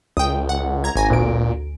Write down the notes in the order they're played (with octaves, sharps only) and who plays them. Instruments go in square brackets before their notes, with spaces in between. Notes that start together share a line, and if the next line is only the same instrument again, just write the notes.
[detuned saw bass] C#2 [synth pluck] G5 D#6
[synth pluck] F#5
A#5 G#6
G#1 G#5 A#6
[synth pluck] D2 D7 [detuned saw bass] A#2